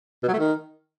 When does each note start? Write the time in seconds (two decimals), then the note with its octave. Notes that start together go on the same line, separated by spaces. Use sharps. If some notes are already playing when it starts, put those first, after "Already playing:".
0.23 B2
0.28 F#3
0.33 A3
0.38 D#3